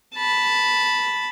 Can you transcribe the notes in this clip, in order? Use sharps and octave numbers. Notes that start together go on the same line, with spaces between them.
A5 B5